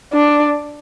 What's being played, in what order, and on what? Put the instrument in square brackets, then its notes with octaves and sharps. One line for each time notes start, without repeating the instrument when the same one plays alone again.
[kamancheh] D4